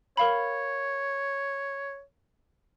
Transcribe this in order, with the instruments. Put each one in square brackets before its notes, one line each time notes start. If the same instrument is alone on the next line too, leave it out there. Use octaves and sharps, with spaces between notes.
[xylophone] A#4 F5 B5 [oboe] C#5